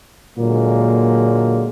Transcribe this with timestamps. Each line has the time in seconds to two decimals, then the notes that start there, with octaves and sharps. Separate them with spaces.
0.38 A#2 D3 F#3 G#3 A#3